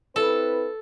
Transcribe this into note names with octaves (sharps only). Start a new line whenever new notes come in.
C4 E4 A4 B4